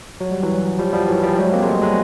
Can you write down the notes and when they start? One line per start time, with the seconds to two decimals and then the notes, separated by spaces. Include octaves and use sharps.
0.21 F#3
0.31 G3
0.43 E3 F#3
0.79 F3 G3
0.93 F3 G3
1.08 E3 F#3
1.23 F3 G3
1.38 F#3 G#3
1.53 A#3 C4
1.63 G#3
1.67 G3 A3
1.82 F#3 G#3